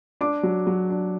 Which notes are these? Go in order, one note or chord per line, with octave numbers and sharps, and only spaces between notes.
D4 D6
F#3
F#3
D4